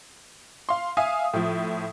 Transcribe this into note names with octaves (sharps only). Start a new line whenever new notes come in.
F5 C6
E5 F5 G#5 D#6
A2 F3